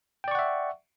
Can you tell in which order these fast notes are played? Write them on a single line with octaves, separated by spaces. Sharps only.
G5 D5 C#6 F#5 E5